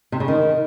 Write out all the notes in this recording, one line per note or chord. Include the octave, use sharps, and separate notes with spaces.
C3
C#3
D#3